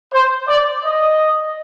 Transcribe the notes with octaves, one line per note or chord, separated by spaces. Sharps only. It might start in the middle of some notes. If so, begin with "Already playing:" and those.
C5
D5
D#5